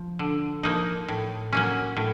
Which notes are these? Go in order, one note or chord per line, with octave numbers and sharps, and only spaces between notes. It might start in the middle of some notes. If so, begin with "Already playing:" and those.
Already playing: F3
D3
F3 A#3 D#4
A2
F#3 A#3 C#4
A2